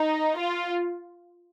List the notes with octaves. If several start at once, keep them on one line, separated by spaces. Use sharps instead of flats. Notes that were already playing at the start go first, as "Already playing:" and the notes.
Already playing: D#4
F4